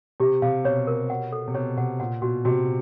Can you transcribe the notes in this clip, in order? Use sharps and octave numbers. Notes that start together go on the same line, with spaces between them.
C3 G4
C3 F5
B2 C#5
A#4
F#5
A4
C3
B2 C#5
C3 F#5
A#2 F#5
B2 F#4
C3 F#4